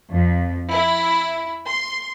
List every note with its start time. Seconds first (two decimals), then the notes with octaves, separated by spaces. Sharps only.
0.11 F2
0.71 E4
1.68 C6